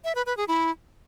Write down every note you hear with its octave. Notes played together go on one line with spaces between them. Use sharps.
E5
B4
B4
G#4
E4